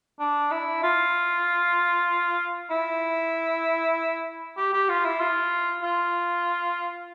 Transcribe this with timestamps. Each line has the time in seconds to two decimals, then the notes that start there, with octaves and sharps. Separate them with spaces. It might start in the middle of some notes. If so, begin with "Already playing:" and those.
0.20 D4
0.51 E4
0.83 F4
2.71 E4
4.57 G4
4.73 G4
4.89 F4
5.04 E4
5.19 F4
5.82 F4